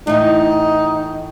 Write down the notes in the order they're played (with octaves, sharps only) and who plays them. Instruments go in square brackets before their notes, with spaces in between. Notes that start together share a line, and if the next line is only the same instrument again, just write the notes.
[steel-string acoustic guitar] A2 E3 [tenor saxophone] D#4